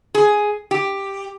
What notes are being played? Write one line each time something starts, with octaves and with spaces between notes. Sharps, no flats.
G#4
G4